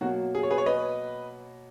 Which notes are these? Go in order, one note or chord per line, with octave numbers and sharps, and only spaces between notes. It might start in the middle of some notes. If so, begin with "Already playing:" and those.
B2 F#3 A#3 F#4
G#4
C#5
G#4 B4
C#5
B4 D#5